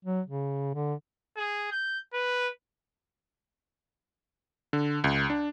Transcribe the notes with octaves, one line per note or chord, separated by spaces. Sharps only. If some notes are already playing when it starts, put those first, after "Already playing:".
F#3
C#3
D3
G#4
G6
B4
D3
C#2
D4